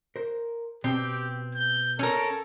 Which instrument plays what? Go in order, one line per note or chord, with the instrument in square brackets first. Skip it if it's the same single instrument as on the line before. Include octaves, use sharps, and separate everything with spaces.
[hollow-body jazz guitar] A#4 C5
[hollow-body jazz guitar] B2 [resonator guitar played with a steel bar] C4 [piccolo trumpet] G4
[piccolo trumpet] G6
[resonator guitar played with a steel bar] C#4 A#4 [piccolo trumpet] A4